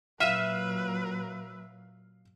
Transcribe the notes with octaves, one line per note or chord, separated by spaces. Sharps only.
A#2 F#3 B4 E5 F5 F6 D#7